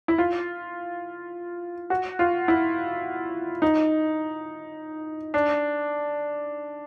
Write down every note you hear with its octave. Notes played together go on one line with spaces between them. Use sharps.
E4
F4
F#4
F4
E4
D#4
D4